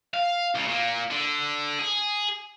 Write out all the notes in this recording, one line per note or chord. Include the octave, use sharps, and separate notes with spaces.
F5
C#2 C#3
A#2 A#3
D3 D4
G#4